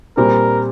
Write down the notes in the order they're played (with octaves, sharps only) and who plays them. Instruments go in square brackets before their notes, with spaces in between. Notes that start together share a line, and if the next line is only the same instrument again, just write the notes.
[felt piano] A#2 G3 C4 [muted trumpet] A#4